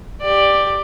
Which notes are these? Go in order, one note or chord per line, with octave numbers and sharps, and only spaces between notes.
G4 D5